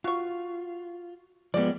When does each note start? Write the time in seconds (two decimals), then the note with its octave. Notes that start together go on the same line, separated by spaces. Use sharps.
0.04 F4 F#4 C#6
1.54 F3 G3 G#3 B3 D5